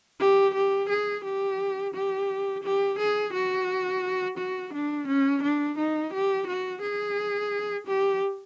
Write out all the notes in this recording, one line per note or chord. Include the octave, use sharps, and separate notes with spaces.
G4
G4
G#4
G4
G4
G4
G#4
F#4
F#4
D4
C#4
D4
D#4
G4
F#4
G#4
G4